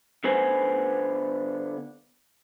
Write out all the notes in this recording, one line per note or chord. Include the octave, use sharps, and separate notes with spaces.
D3 B3 B4 C5 G#5